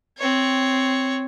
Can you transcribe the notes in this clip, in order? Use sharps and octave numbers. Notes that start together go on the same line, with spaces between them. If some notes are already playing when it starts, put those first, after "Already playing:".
C4 C#5